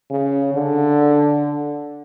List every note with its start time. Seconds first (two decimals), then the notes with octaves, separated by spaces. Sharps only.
0.10 C#3
0.54 D3